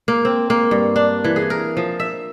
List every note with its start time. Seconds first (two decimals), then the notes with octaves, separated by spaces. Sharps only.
0.08 A#3
0.25 C4
0.50 A#3
0.71 G2
0.96 D4
1.24 E3
1.36 G#4
1.50 A#4
1.77 F3
2.00 E5